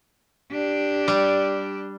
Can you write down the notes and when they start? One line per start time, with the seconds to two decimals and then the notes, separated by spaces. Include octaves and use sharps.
0.52 D4 G4
1.08 G3